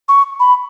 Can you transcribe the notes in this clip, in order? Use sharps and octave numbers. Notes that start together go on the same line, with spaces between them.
C#6
B5